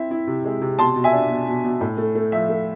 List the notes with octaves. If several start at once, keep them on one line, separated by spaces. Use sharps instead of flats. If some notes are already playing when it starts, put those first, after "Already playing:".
Already playing: C4 E4 E5
E4
C3
G#3
C3
B2 A5 C6
B2
E5 G#5
D4
B2
B2
B2
A2
A3
A3
F3 E5
A3